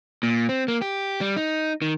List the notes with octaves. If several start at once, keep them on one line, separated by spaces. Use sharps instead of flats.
A#2
C4
A#3
G4
G3
D#4
D#3